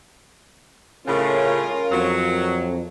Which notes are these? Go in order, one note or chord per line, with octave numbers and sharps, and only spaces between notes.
A2 C#3 C#4 F4 A#4
F2 F#3